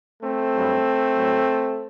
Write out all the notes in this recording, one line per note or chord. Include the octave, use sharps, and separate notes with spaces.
A3 C4
G2 F#3
A2 F#3